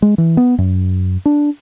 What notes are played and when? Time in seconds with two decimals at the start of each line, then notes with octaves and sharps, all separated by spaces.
0.02 G#3
0.18 E3
0.37 B3
0.58 F#2
1.26 D4